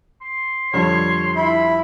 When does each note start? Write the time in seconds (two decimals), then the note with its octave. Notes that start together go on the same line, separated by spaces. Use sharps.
0.22 C6
0.74 F2 D3 G3 C#5
1.36 E4 B5